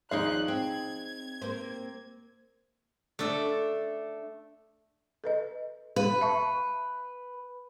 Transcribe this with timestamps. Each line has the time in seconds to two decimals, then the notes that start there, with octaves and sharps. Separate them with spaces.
0.11 D#2 F3 D#4 G#4 C#5 D5 F5 F#6
0.48 C4 G#6
1.42 A#3 C4 C5
3.19 A3 D4 A4
5.24 A4 B4 D#5
5.96 B4 F5
6.21 E5 A5 C#6